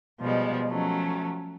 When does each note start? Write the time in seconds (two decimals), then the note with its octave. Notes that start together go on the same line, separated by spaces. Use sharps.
0.21 B2 F3 G3 G#3
0.68 F3 F#3 A3 C#4